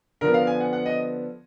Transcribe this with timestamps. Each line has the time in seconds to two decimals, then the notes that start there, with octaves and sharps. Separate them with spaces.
0.21 D3 F3 B3 A#4
0.34 F5
0.47 G#5
0.60 F#5
0.73 F#5
0.86 D#5